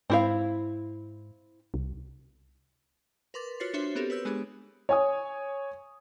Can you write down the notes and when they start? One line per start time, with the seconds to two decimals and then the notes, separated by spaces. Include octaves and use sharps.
0.10 G#2 C4 E4 F5
1.74 C2
3.34 A#4 B4 C6 D6 A6
3.60 F4 F#4 B4 C#5 A6 C7
3.74 D4 F#4 C5 C#5 E5 C6
3.95 B3 C4 G4 A4 A#4
4.10 B4 C#5 E6 G6
4.25 G#3 B3 D4 G4 G#4
4.89 C#5 G#5 D#6